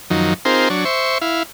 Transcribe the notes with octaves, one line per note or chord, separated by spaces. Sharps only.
F#2 D#3 F3 F#3 D#4
C4 D#4 F4 G#4 A#4 C5
F#3 D4 C#5
C5 E5 C#6
E4 F5